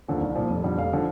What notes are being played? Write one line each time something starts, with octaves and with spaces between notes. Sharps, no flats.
D#2 D3 F3
C2
A#2 F3
F1
F2 D3 G3
F1 F5
D3 F3